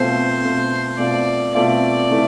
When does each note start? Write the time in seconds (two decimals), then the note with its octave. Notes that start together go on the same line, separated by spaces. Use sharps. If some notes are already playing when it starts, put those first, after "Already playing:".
Already playing: B2 A3 C4 F4 C5
0.43 B2 A3 C4 F4
0.98 B2 A3 C4 F4 D5
1.55 B2 A3 C4 F4 D5
2.10 C3 E3 A3